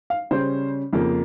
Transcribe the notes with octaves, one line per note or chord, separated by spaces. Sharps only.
F5
C#3 G3 C#4 C5
F2 C#3 F3 A#3